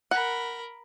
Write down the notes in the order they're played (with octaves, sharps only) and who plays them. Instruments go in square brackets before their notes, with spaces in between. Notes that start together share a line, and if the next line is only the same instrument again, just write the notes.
[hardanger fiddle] A#4 B5 [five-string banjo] F#5